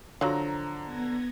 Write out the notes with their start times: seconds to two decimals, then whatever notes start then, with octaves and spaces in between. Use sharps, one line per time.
0.21 D3 F3 F#3 A#5
0.85 B3 G#6 A#6